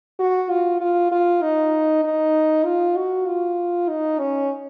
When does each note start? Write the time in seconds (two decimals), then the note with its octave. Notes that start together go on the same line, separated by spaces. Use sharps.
0.19 F#4
0.50 F4
0.81 F4
1.12 F4
1.42 D#4
2.04 D#4
2.65 F4
2.96 F#4
3.27 F4
3.89 D#4
4.19 C#4